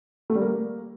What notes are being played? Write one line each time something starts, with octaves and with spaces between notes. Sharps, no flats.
A3
G3
A#3